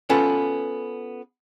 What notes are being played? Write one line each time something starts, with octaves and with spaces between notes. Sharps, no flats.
B3 C#4 F4 A4 B4